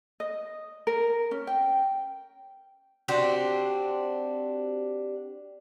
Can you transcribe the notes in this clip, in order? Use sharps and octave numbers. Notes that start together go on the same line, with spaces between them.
D#5
A#4
C#4
G5
C4 D4 F#4 G4